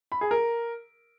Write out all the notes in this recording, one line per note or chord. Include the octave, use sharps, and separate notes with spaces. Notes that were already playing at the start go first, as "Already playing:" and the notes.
B5
G#4
A#4